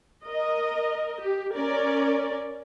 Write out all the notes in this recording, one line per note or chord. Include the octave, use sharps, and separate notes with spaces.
A#4 D#5
G4
C#4 A#4 D5